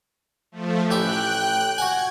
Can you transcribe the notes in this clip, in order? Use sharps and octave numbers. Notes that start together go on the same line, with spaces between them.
F3 A3
A1 G4 E5 G5 F#6
F#4 F#5 G#5 G#6